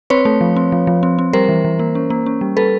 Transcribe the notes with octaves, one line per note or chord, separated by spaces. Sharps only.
C4 B4 C#5
A3
F3
C4
F3
F3
C4
C4
G3 A#4 C5
E3
E3
A#3
C#4
A#3
C#4
G3
G3 A4 B4